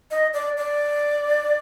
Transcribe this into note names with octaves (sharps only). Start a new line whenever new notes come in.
D#5
D5
D5